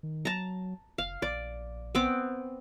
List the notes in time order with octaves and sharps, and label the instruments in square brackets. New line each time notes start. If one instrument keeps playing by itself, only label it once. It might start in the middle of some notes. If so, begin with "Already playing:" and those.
[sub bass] D#3
[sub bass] F#3 [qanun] A5 A#5
[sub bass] F1 [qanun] F5
[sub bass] A#1 [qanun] D5
[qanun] B3 C4 D6